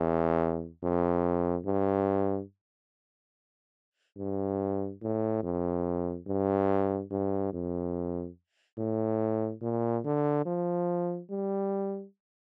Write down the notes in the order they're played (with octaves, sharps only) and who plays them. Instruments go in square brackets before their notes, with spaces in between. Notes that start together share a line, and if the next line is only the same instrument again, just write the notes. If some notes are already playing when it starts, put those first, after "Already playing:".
Already playing: [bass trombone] E2
F2
G2
G2
A2
F2
G2
G2
F2
A2
A#2
D3
F3
G3